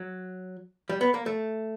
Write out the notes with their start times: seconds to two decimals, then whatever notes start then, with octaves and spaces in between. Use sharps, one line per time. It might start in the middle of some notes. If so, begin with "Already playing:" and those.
Already playing: F#3
0.90 G3
1.01 B3
1.14 A#3
1.26 A3